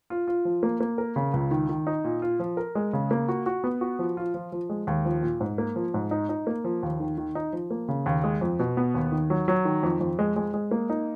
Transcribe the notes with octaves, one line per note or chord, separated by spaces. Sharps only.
F4
F4
F3
A#3
A#3
A#4
C#3
C#2
D#3
D#3
D#4
A#2
F4
F3
A#4
G#3
C#3
A#3
F#4
F#4
B3
F#4
F3
F4
F3
F3
G#3
D#2
F3
A#2
G#2
A#3
F3
G#2
D#4
D#4
A#3
F3
D#2
D#3
D#3
D#4
F3
A#3
C#3
D#2
G#3
F2
B2
B3
D#2
D#3
F#3
F#3
D#3
F2
F2
G#3
G#3
G#3
A#3
D#4